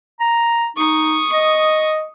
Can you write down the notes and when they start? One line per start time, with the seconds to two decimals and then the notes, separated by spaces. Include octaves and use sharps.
0.20 A#5
0.76 D#4 C#6 D#6
1.32 D#5